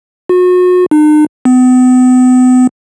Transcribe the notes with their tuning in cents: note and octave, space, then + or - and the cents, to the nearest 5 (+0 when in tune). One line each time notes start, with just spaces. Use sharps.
F#4 -35
D#4 -45
B3 +40